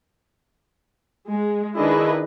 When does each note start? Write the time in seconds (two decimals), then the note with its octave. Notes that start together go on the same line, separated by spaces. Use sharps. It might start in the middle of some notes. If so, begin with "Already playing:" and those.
1.30 G#3
1.78 D#3 D4 E4 G#4 B4 D#5